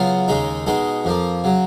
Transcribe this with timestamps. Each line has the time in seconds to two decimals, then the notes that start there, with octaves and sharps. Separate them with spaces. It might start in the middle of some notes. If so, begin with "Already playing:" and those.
Already playing: C#3 F#3 B3 F4
0.28 D#2 C#3 G#3 D#4 G#4
0.66 B2 G#3 D#4 G#4
1.05 F2 F3 A#3
1.44 C#3 F#3